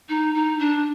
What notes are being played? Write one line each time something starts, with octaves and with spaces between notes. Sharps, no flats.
D#4
D#4
D4